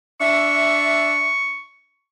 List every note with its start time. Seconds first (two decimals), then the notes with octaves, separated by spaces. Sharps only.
0.20 D4 E5 C#6